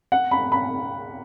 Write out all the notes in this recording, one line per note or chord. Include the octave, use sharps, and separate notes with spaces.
F#5
B5
B5